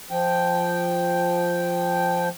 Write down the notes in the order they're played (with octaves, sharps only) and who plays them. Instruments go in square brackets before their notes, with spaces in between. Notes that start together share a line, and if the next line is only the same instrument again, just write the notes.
[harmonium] F3 G5